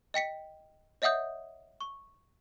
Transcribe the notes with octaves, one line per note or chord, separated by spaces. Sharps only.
D#5 G5 B6 C#7
C#5 D#5 E5 F#5 D#6 G6
C#6